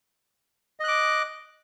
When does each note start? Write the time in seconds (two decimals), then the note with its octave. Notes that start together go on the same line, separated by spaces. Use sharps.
0.80 D#5
0.84 F#6
0.88 D6